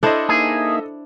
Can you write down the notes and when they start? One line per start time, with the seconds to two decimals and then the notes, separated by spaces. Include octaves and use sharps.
0.03 D4 E4 A4 C5 D#5
0.29 A#3 D#4 G#4 E5